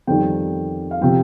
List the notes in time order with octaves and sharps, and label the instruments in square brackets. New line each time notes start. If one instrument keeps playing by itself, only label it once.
[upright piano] F2 D#3 G3 G5
F5
C3 F3 G5